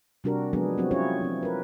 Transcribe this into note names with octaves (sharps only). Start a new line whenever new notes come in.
C3 G3 D4 F#4 G4 A#4
F3 F#3 G#3 B3 D4 G#4
F#3 C4 F#4
C#4 E4 F4 G#4 C#5
F3 C4
A#4 B4